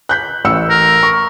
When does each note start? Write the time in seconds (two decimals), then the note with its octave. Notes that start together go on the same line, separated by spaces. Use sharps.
0.09 F#6 G6 B6
0.45 A1 E6 C#7
0.70 A#4
1.03 C#6